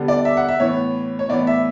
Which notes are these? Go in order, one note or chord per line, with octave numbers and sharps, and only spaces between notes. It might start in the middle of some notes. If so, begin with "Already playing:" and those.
Already playing: D3 G3 B3
D5
E5
F#5
E5
A2 E3 B3 C#5
C#5
A2 E3 B3 D5
E5